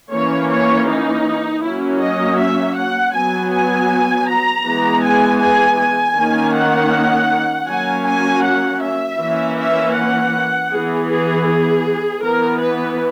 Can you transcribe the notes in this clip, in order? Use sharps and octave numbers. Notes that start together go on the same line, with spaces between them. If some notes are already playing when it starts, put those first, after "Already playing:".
E3 A#3 C#4 C#5
C#5
D#4
F#3 A#3 C#4 E4
D#5
E5
F#5
F#3 B3 G#5
G#5
A#5
E3 G#3 B3
G#5
G#5
G#5
D#3 A#3 C#4
F#5
F#3 A#3 C#4 G#5
G#5
F#5
E5
E3 A#3 C#4
E5
F#5
E3 B3 G#4
G#4
G#4
E3 B3 A#4
B4